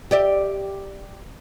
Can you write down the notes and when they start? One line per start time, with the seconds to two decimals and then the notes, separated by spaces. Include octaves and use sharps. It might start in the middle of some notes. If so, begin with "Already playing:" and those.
0.11 G4 D5 E5